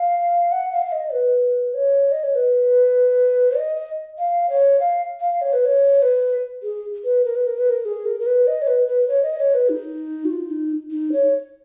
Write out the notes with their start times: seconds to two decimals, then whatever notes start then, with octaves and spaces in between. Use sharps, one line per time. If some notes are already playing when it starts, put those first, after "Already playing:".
Already playing: F5
0.52 F#5
0.72 F5
0.86 F5
0.92 D#5
1.13 B4
1.74 C#5
2.12 D#5
2.24 C#5
2.35 B4
3.58 D#5
4.18 F5
4.49 C#5
4.80 F5
5.20 F5
5.41 C#5
5.53 B4
5.65 C#5
6.02 B4
6.63 G#4
7.04 B4
7.25 A#4
7.35 B4
7.46 A#4
7.58 B4
7.69 A#4
7.85 G#4
8.06 A#4
8.20 A#4
8.26 B4
8.47 D#5
8.62 C#5
8.67 B4
8.87 B4
9.08 C#5
9.23 D#5
9.38 C#5
9.54 B4
9.69 D#4
10.25 F#4
10.30 F4
10.51 D#4
10.91 D#4
11.12 C#5